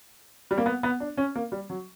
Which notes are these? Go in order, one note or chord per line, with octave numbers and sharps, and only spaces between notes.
G3
A#3
B3
B3
D4
C#4
A#3
G3
F#3